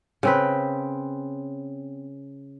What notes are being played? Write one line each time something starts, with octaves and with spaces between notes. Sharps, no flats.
C#3 C4 B4